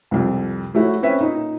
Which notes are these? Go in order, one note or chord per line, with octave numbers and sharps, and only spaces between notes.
C2 F2
F3 A3 E4 F#4 C#5
C4 C#4 B4 C#5 E5
A#2 D#4